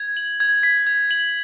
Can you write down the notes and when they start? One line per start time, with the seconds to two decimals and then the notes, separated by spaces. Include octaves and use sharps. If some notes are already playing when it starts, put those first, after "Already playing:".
Already playing: G#6
0.17 F#7
0.40 G#6
0.63 B6
0.87 G#6
1.11 F#7